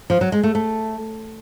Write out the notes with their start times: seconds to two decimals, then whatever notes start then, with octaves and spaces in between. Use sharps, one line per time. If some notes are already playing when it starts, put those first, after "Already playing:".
0.10 F3
0.21 F#3
0.32 G#3
0.43 A3
0.55 A3